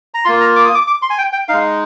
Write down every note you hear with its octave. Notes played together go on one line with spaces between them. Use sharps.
A#5
A#3 F4 C6
A#5
D6
D#6
D6
D6
C6
G#5
G5
G5
G#3 D#4 F5